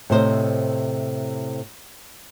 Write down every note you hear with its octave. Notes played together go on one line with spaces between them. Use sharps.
A2 C3 C5 D#5